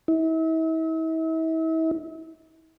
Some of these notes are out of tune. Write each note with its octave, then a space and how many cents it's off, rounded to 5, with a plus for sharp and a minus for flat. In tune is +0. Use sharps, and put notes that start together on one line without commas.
E4 -40